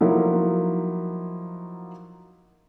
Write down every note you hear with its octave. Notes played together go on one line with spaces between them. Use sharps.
F3 F#3 A#3 D#4 E4